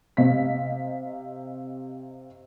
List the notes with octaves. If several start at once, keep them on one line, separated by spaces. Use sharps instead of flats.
C3 D#5 F5 B6